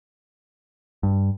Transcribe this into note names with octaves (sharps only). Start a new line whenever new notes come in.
G2